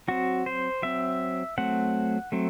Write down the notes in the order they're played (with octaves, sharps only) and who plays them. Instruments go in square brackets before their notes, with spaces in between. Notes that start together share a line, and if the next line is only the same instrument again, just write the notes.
[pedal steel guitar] F#3 C4 F#4
C5
F#3 C4 E5
F#3 A3 C4 F#5
F#3 A3 C4